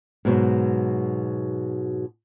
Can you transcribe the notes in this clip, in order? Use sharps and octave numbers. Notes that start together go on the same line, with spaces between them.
G#2 B2 F#3